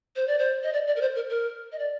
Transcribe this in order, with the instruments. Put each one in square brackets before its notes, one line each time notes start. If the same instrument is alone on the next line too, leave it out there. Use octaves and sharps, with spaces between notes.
[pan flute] C5
D5
C5
D#5
D5
D5
A#4
C5
A#4
A#4
D#5
D5